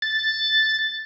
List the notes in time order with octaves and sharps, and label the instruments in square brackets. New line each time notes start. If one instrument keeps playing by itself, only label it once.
[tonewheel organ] A6